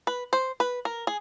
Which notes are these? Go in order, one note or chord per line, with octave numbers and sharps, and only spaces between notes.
B4
C5
B4
A#4
G#4